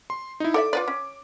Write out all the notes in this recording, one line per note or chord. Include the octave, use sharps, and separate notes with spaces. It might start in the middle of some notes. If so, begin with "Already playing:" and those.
C6
D#4 E4
A4 D5 E5 D6
F4 B4 D5
C#4